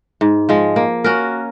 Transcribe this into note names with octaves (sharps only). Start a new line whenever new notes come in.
G#2
F3 G#3
A#3
C#4 F#4 A#4